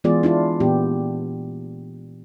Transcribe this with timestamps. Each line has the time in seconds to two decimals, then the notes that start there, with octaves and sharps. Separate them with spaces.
0.04 E3 G#3 B3 F4 G#4 D5
0.23 D4 E4 F4
0.60 A#2 E3 B3 G4